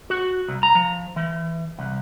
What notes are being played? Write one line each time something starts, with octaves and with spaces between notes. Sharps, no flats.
F#4
C2
A#5
F3
E3
C2